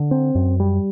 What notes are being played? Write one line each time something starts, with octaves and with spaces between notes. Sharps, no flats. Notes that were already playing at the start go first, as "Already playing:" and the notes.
Already playing: D3
C4
F#2
G3